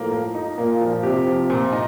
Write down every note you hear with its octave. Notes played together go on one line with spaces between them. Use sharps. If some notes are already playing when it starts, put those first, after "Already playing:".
Already playing: A2 F3 A#3
A#3
D#4
A#2 A#3
F3
C3 G4
F3
A#2
D#4